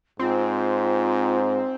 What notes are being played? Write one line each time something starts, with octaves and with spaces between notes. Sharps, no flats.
G#2 C4 F4